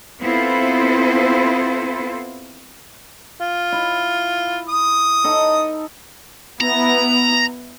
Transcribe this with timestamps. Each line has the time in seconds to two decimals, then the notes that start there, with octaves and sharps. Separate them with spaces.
0.21 B3 C4 E4 F4 A4 C5
3.40 F4
3.72 E4
4.69 D#6
5.24 D#4 A4
6.61 B3 E4 A#5